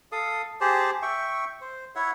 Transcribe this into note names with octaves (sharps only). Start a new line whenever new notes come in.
A4 F5 D#6
G4 G#4 C5 A5
E5 G5 C#6
C5
E4 C#5 E5 F#5